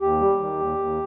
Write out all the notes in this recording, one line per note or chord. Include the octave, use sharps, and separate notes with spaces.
D#2 G4
G3
D#3
D#2
D#2